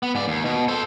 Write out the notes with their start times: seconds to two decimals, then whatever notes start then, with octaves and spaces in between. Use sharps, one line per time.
0.03 B3
0.15 G#2 D5
0.28 D#2
0.45 B2
0.68 A4 C5